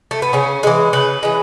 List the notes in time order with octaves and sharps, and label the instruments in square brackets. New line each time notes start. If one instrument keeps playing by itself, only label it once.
[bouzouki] A3
B3
C#3 C#4
E3 G#3
C#3 B4
E3 G#3